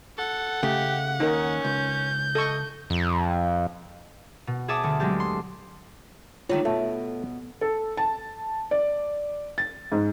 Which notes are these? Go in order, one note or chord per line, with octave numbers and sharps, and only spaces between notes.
A4 F#5
C#3 A3 G4
D#2 C#4 D#4 A#4
C#2 G6
A4 D#5 C#6
F2
B2
G#4 C#5 E5 A5 D6 D#6
D2
F#3 G#3 A3 C4 D4 G4
C6
D3 D#3 A3 F4 C#5
B2 A3
A4
A5
D5
A6
G#2